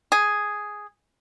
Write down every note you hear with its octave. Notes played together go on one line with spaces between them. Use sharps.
G#4